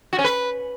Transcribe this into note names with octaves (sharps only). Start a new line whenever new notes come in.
F#4
C#4
B4